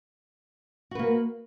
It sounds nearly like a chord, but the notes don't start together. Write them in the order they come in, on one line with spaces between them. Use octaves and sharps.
F#4 B4 A#3